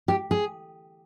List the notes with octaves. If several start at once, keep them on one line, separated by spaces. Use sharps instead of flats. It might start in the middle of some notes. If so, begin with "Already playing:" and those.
G4
G#4